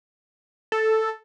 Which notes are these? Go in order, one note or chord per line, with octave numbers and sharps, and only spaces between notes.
A4